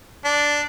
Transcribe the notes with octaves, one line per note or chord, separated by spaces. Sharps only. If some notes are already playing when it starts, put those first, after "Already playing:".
D4